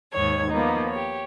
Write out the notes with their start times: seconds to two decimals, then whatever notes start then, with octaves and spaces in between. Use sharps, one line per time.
0.14 D#2 G#2 D#3 C#5 G#6
0.51 F3 A#3 B3 D#4
0.90 G4 C#5